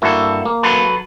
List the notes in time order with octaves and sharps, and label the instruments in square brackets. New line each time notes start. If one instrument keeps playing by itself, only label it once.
[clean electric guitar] G2 A4 [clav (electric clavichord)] A#3 E4 F#4
[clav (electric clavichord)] A#3
[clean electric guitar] F#3 A4 B4